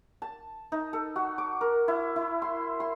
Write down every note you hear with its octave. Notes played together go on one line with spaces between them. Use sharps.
A5
D#4
A4
F#4
D6
A#4
E4
E4
C6
C6